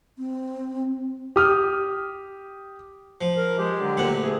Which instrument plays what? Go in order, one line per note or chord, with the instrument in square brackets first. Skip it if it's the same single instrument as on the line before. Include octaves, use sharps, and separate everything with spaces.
[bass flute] C4
[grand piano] G4 D#6 F6
[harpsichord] F3
[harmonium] A#4
[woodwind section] G#3 [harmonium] G4
[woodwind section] D3 F#3
[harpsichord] D2 A#2 F#5
[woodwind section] E3 C4 G#4